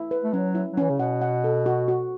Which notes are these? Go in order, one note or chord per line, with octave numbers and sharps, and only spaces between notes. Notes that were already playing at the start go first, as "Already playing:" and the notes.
Already playing: E4
B4
A3
F#3 C#4
E4
F#3
E3 C#4
C#3
B2 F#5
F#5
A4
F#4
F#4